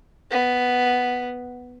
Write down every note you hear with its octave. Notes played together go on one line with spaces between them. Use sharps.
B3